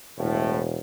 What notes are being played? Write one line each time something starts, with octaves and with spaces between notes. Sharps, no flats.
E1 A2